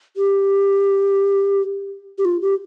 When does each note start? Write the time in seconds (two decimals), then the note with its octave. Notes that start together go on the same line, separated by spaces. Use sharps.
0.17 G4
2.18 G4
2.25 F4
2.42 G4